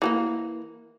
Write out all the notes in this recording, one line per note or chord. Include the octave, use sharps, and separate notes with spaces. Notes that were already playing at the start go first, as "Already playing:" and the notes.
E3 F#3 A#3